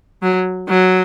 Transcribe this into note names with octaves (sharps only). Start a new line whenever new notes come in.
F#3
F#3